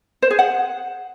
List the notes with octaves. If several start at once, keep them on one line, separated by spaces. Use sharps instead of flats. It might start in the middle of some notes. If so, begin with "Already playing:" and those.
C5
G#4
F#5